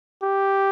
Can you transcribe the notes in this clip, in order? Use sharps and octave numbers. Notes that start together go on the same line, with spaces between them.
G4